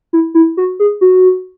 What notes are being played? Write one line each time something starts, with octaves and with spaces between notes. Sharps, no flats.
E4
E4
F#4
G#4
F#4